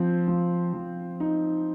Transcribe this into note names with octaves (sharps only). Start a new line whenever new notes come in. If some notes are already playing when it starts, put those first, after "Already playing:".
Already playing: F3 C4
F3
F3
D#4